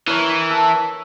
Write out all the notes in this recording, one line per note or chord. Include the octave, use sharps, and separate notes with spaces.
E3 A#4 C#5
A4